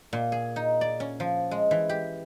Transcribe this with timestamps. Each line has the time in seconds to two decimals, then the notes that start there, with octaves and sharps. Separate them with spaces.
0.13 A#2
0.32 G#4
0.56 D#4
0.81 D5
1.00 C#4
1.20 F3
1.51 G#3
1.71 E3
1.89 G4